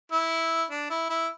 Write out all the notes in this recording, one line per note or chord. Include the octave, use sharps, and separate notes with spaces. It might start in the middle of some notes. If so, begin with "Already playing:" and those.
E4
D4
E4
E4